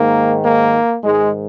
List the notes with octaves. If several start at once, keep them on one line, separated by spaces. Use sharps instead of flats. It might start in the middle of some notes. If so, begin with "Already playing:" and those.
Already playing: G#2 D#3 A#3
A#3
G#2 D#3 G#3